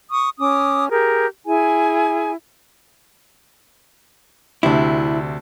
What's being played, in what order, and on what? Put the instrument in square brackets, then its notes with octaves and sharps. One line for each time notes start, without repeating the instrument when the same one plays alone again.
[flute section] C#6 D#6
C#4 D6 D#6
G4 G#4 A#4
E4 G#4 G#5
[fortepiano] D2 C3 [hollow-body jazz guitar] D4 E4